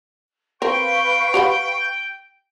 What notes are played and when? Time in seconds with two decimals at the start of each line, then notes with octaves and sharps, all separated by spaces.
0.62 C4 A#4 B4 F5 G5 C#6
1.34 G4 F#5 B5